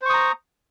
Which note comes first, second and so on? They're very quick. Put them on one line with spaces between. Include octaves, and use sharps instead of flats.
C5 C#6 D#6 A#5